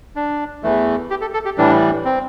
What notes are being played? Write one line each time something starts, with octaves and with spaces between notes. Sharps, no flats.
D4
E2 E3 A3
G4
A4
A4
G4
A2 E3 G3 D4
C4